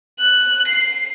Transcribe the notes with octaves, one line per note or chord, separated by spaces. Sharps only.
F#6
C7